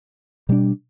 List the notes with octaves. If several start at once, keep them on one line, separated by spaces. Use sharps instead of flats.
B2 G3 D4